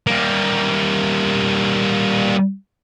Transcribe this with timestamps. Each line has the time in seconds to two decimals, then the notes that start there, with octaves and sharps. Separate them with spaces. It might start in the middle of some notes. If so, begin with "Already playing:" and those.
0.07 G3 A#3